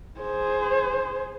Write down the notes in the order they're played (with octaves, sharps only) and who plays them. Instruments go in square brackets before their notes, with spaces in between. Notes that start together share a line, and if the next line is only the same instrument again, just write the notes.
[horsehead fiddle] G#4 C5